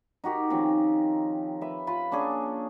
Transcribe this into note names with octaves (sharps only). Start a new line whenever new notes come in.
D#4 F#4 G4 A#4
D#3 F3 C4 C#4
B4 E5
F4 B4 B5
A#3 C#4 D4 G#4